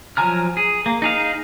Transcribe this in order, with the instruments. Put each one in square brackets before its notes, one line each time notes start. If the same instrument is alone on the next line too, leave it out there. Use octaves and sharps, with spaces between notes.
[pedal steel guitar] F3 F#3 G#5 A#5 F6
G#4
A#3
D#4 G#4 F5